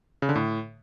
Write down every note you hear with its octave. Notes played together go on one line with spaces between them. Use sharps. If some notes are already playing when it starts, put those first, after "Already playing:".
C#3
D3
A2